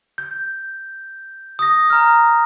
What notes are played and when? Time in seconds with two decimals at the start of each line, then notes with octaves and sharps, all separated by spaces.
0.18 G6
1.59 D#6 A#6
1.90 A#5 F6